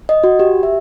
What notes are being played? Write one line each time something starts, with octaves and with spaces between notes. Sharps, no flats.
D#5
F#4
G4
E5